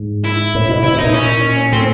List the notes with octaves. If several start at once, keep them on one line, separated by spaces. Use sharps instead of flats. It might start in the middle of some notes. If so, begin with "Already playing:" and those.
Already playing: G#2
E4
A2
B2
C3 E4
B2
D#4
A#2
C#4
A2 C4